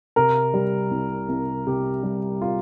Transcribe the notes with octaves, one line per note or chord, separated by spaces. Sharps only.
C3 A#4
G3
C2
C2
C3 G4
G3
F4